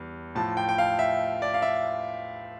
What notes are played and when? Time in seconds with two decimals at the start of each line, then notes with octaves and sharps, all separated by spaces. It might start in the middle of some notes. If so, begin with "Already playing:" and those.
Already playing: E2 G3
0.35 A2 F3 A5
0.57 G5
0.69 G5
0.78 F5
0.99 E5
1.42 D5
1.54 F5
1.62 E5